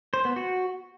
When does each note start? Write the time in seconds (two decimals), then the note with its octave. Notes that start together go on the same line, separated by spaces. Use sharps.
0.14 C5
0.25 B3
0.36 F#4